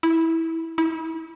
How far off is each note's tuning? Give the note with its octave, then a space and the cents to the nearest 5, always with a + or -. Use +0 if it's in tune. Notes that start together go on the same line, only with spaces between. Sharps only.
E4 -15
E4 -35